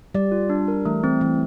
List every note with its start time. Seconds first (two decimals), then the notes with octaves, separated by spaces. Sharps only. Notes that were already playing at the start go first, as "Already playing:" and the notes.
0.15 G3 D5
0.32 F4
0.50 D4
0.68 A#4
0.85 E3 A3
1.04 E3 C4
1.21 E3 A3